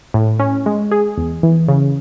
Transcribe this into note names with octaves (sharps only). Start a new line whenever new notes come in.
A2
C#4
G#3
G#4
E2
E3
C#3